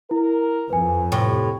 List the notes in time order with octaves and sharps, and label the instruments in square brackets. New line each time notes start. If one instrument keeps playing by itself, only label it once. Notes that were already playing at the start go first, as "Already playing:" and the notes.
[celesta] E4 [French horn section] A#4
[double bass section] F2 [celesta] B4 G#5
[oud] A2 C3 [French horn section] B4 [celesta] G5 C#6